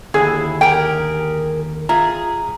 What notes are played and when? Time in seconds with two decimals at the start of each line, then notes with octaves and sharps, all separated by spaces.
0.14 D#2 G#2 D3 E4 G#4
0.61 G4 G#4 A#4 G5
1.89 F4 G#4 E5 A#5